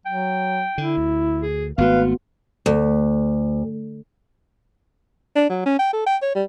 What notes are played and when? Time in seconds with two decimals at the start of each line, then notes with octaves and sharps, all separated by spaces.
0.06 F#3 G5
0.78 D3 E4
0.97 D2
1.42 G#4
1.78 G#1 A3 B3 F#4 B4 F5
2.66 D2
5.36 D4
5.49 F#3
5.66 C#4
5.79 G5
5.93 A4
6.06 G5
6.22 C#5
6.35 G3